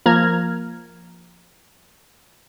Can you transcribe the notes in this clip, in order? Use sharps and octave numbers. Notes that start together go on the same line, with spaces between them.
F3 A#3 A#5 F6 G#6